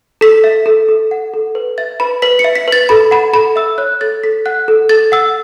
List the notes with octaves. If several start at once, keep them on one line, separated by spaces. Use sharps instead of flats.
A4 B6
E5
A4
A4
F#5
A4
B4
E5 A6
B4 B5
B4 B6
C#7
E5
B6
B4 A6
A4 B5
F#5 B5
A4 B5
E5 E6
C#5 F#6
A4 A6
A4 B6
F#5 F#6
A4
A4 A6
F#5 E6